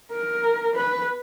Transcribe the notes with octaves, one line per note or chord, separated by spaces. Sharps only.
A#4
B4